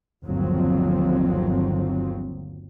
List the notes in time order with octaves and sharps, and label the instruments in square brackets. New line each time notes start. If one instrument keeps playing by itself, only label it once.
[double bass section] G1 D#2 F3 F#3 C4